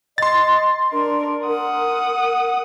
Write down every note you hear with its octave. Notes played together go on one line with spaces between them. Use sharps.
D#5 C6 A6
D4 A#4
A#4 F#5 D#6